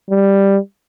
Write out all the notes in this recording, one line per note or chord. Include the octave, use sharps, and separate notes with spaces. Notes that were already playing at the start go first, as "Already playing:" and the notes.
G3